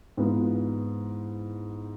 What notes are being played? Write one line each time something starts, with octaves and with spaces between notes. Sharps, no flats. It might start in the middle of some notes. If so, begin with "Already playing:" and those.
G#2 E3 B3 F4